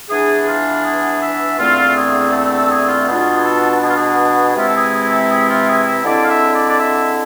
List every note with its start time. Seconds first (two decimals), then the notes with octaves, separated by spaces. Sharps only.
0.09 E3 B3 D4 G#4
0.43 G#4
0.47 F4
0.84 G#4
1.21 E5
1.59 E2 D3 A3 C4 F4
1.96 G#4
2.32 A4
2.51 A4
2.70 G#4
2.88 F4
3.07 B2 B3 D4 F4 G#4
3.36 G#4
3.44 A4
3.82 G#4
3.89 F4
3.97 G#4
4.47 G#4
4.55 C3 E3 G#3 C4 E4 F4
4.68 A4
4.75 G#4
4.93 G#4
5.12 A4
5.30 G#4
5.49 F4
5.68 G#4
5.86 E5
6.05 D3 G#3 C4 E4 D5
6.24 F5
6.30 E5
6.55 D5
6.69 D5
6.79 E5